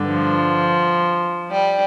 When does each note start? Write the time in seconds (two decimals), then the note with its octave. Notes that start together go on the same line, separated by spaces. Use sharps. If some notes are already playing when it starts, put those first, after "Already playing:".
Already playing: G2 D3
0.08 F3
1.52 G3